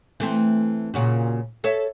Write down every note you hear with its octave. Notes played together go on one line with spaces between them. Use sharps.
E3 A3 C4
A#2 C#3 F#4
A4 C#5 E5